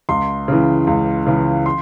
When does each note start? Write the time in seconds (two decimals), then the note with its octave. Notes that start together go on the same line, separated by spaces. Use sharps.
0.09 C#2 C6
0.48 C#3 E3
0.87 C#2
1.27 C#3 E3
1.66 C6